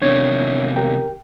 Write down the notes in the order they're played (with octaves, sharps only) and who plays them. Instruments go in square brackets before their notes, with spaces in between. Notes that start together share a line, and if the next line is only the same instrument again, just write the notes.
[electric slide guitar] E2 C3 D#3 [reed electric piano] D4 C#5 G#6
[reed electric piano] G4 A#4 G5